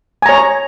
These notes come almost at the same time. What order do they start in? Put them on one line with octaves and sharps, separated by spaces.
G#5 A#5 C#5